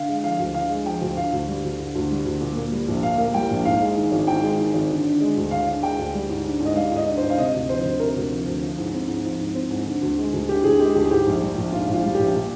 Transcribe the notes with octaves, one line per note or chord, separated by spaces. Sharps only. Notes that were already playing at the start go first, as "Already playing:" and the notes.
Already playing: D3 F5
G#3
F3 F5
D2
D3 F5
G#3
F3 G5
D2
D3 F5
D2
G3
D2
D3
D2
G3
D2
A#2
A#3
G3
A#1
A#2 F5
A#3
G3 G5
A#1
G#2 F5
G#3
D#3
G#1
G#2 G5
G#3
D#3
G#1
D3
D4
G#3
D2
D3 F5
D4
G#3 G5
D2
G3
G#2
D4
G#2 D#5
G3 F5
G#2 D#5
D4
G#2 C5
F5
C3 D#5
D2
F3 C5
D2
C3 A#4
D2
F3
D2
F3
G#2
C4
G#2
F3
G#2
C4
G#2
D3
D2
G#3
D2
D3 G4
D2 G#4
G#3 G4
D2 G4
G#4
G#2 G4
A#1
G3
A#1
G#2 F4
A#1
F4
G3
A#1 G4
A#2